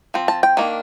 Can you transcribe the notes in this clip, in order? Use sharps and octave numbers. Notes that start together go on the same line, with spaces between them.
F3 C4
A5
G5
D#3 A#3 D4